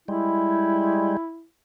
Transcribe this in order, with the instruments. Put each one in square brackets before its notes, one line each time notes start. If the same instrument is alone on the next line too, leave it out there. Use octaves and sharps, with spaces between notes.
[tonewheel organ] G3 G#3 [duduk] E4